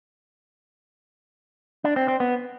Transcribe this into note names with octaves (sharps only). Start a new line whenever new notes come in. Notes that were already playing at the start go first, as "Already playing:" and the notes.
D4
C4
C4
B3